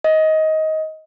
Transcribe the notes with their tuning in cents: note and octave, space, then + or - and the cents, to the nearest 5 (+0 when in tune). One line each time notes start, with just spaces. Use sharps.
D#5 +15